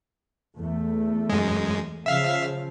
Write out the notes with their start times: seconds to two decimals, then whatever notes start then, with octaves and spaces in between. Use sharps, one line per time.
0.55 E2 A3
1.30 F#2 G#3
2.06 C#3 F3 E5 F5